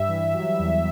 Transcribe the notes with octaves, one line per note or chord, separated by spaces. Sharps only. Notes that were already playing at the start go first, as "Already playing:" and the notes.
Already playing: G2 G3 E5
E3
F#3
E2